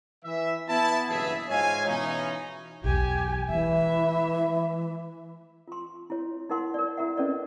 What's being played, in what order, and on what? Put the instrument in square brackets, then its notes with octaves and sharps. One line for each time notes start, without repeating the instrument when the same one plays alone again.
[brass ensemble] E3 E5
B3 E4 A5
F#1 G2 B2 E3 G#4 E5
G#2 F4 C#5 D#5 F5 G#5
B2 E3 C#4 D#4
[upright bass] B1 E2 [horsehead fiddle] G4 G#5
[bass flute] E3 [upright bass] G#3 A3 [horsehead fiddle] E5
[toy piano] F4 C6
E4 C#5
D#4 E4 A#4 F#5 C6
A#4 D5
E4 A#4 E5 F#5
C#4 A4 B4 D5 D#5